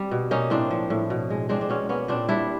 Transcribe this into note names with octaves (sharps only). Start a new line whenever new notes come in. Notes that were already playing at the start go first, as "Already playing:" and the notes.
Already playing: G3 C4
B2
A#3 C#4 D#4
A2 C4 D4
F3
A2
B2
G#3
G#3 C4 D4
D4
B2 B3 C#4
A#3 B3 C#4
A#2 C4 D4
G3 D4 E4